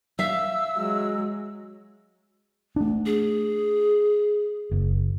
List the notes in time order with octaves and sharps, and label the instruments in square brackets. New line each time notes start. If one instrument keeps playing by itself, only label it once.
[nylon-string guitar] E5 F5 [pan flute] E6
[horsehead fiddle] F#3 G#3
[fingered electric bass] A3 D4
[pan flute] G#4
[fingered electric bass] F#1